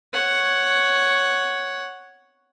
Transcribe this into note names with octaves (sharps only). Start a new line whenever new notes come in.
C#5 F#5